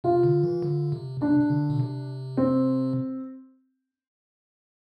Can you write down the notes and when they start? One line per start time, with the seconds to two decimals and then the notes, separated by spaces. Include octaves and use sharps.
0.04 C3 F4
0.23 D3
0.43 E3
0.63 D3
0.92 C3
1.21 C3 D4
1.41 C3
1.50 D3
1.70 B2
1.80 C3
2.37 C4